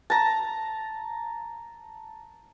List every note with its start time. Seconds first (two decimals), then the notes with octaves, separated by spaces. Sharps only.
0.10 A5 A#5